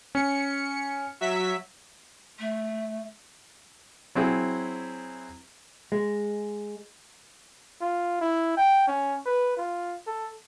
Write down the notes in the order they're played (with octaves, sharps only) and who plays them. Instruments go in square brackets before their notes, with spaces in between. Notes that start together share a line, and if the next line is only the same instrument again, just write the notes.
[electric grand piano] C#4 [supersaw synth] C#7
[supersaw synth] F#3 E5 B6
[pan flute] A3
[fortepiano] F#3 C4 E4 G#4
[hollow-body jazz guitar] G#3
[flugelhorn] F4
E4
G5
C#4
B4
F4
A4